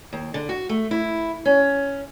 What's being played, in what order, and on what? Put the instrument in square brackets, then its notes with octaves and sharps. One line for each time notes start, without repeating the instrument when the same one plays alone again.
[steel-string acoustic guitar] D#2
D3
F#4
A3
E4
C#4